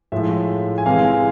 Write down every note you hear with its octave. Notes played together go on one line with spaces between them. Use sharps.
A2 F3 G#3 E5
G#5
C3 E3 G#3 F5
G#5